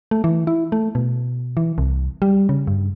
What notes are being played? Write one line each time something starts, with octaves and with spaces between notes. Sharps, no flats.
A3
E3
E4
A3
B2
E3
C2
G3
C#3
G2